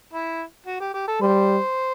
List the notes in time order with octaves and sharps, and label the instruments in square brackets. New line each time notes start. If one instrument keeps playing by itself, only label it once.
[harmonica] E4
F#4
G4
G4
A4
[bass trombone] G3 [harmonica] C5